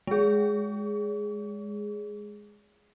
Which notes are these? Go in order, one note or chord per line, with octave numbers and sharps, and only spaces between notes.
G#3 G#4